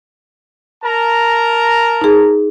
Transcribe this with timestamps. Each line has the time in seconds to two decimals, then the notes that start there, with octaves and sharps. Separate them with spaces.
0.83 A#4 A5 A#5
2.01 D#4 G#4